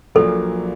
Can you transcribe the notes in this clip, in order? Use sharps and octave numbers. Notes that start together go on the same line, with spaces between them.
A#1 A#2 F#3 A#3 A4